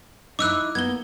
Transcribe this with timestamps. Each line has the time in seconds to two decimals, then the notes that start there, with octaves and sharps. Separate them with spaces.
0.39 D#4 E4 D6 E6 F#6
0.75 A#3 B3 G#6 G7